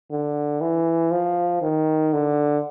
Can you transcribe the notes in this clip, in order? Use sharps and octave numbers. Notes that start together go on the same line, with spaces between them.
D3
E3
F3
D#3
D3